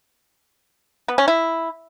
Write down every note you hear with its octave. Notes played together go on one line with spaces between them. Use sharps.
B3
C#4
E4